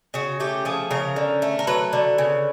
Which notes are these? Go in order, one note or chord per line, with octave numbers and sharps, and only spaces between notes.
C#3 F#4
A3 G4
F3 G#4
C#3 A#4
D3
A3
A#4
F#3 B4
D3
C#3